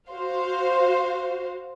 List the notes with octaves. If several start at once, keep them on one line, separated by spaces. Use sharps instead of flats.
F#4 C5 F5